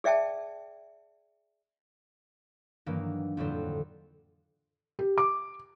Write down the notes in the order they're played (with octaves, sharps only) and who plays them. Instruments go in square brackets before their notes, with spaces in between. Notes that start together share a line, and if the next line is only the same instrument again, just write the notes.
[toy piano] G#4 D5 E5 G5 A5
[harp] G2 D#3 E3 F#3 A#3
F2 A2 D3 F#3 G3 C4
[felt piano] G4
D6